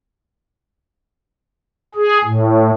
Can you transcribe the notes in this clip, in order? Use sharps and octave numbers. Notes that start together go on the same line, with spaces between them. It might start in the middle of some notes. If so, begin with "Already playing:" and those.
G#4
A2